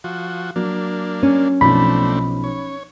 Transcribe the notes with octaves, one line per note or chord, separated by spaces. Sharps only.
F3 F#4
F#3 A#3 D4
C#4
B1 F3 A3 C4 D4 B5
C#5